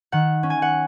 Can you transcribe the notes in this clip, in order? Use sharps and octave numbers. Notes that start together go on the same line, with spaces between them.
D#3 F#5
C#4
G#5
F#5